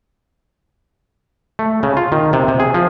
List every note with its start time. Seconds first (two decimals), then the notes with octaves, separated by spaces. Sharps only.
1.59 A3
1.83 C#3
1.97 F4
2.12 D#3
2.33 C3
2.48 C3
2.60 G#4
2.74 F3